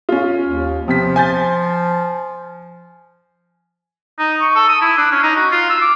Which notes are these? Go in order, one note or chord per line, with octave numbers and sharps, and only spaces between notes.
C#4 F4
D#2
C3 F3 B3 B6
G#5 G6 A6
D#4
C#6
A4
D#6
E4
D4
C#4
D#4
F#4
F4
E6
D6